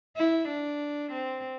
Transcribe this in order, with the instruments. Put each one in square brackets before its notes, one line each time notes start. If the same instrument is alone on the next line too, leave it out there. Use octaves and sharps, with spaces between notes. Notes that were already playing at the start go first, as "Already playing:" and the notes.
[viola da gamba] E4
D4
C4